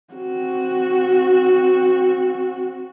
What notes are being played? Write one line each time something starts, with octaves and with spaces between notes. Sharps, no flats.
C4 F#4